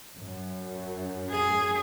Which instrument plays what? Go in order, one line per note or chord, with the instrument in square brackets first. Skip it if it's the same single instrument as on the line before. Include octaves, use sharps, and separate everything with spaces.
[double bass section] F#2
[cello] G#4